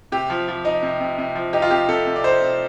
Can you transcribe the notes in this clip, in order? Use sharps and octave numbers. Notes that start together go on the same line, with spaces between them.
C3 G4
F3
F3
D#4
C3
C3
C3
F3
D#4 G4
F4
C3 G4
C3 A4
C3
D5
D#4 C5
C3